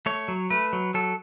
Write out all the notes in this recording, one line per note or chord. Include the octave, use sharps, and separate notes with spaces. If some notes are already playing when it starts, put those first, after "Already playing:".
A3 C#5
F#3
A3 B4
F#3
F#3 A4